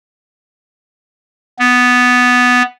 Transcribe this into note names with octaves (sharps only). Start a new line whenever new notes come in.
B3